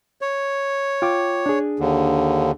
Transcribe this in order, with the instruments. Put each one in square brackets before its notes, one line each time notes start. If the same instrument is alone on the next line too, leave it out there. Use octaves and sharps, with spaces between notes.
[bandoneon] C#5
[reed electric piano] F4 G5 D6
D4 G#4
[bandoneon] D#2 D3